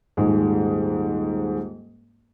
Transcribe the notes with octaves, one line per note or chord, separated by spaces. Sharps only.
D#1 G#2 G#3